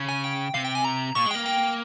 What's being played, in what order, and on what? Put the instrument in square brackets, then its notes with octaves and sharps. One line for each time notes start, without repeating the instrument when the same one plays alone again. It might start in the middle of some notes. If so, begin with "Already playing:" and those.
Already playing: [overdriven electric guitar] C#3
[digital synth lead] G#5
G5
[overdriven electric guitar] C3 [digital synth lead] F5
[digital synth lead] G5
G#5
A#5
[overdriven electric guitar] A#2 [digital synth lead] C#6
[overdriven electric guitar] G#3
[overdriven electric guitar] A#3 [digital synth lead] G5
[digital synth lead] G5